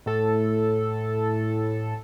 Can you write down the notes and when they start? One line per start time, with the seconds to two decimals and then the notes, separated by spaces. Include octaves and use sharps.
0.06 A2 A4